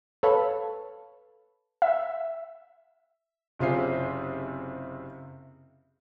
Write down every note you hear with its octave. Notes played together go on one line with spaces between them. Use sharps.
A4 B4 C#5 F5 A5 B5
E5
F#1 C3 F4 G#4 C5 C7